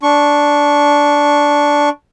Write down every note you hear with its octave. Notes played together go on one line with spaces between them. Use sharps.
D4 C#6